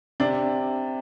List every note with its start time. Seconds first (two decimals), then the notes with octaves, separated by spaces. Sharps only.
0.20 C3 D4